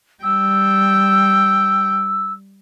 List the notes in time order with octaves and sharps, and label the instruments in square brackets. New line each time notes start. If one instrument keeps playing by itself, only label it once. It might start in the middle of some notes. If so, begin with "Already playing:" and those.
[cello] G3 G5 [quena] E6